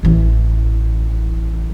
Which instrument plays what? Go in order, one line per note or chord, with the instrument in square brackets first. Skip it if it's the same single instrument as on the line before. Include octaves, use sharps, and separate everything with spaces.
[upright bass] A1 E3